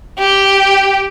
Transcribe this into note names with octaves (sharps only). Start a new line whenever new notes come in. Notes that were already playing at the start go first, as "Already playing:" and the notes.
G4